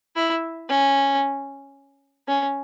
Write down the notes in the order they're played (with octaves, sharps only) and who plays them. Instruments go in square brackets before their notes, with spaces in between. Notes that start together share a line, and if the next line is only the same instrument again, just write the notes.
[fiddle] E4
C#4
C#4